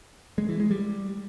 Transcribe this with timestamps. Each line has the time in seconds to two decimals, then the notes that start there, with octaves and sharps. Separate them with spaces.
0.38 G#3
0.49 E3
0.60 G#3
0.71 G3